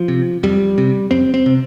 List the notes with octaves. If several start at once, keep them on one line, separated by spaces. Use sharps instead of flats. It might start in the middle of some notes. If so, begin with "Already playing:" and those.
Already playing: F3
C3
F2 G3
C3
F2 C4
C4
C3